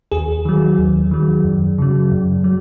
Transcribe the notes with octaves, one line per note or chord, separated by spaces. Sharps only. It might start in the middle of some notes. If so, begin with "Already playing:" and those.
D#2 G#4
D#3 F#3
D#2
D#3 F#3
F#2
C#3 F#3
F#2
F#3